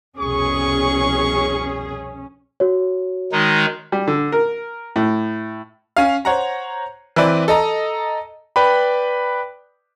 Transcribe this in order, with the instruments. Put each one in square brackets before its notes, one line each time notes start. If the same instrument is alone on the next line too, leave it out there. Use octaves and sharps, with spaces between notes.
[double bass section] C2 F2 B2 [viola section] C#4 [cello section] G#4 [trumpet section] C#6
[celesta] F#4 C#5
[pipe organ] D#3 G#3 D#4
[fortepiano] G3
D3
A#4
A2
[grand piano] C#4 F5
C5 C#5 F#5 A#5
E3 C4 E4 B4 D5
A4 D#5 A#5
[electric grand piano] B4 D5 G5 B5